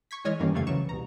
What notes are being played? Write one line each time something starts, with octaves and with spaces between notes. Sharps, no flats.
C#6 G#6 B6
E3 G#3 C#5 D#5 F6 G#6
G2 D#3 E3 G3 A#3 C#4
F2 C#3 G3 A3 F5 G#6
C2 C#3 E3 F#3 C#6 E7
C2 B2 A#5